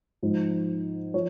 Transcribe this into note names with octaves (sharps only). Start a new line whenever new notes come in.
G#2 F3
F3 C#5